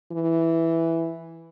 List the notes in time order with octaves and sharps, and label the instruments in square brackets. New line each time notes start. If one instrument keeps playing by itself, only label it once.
[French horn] E3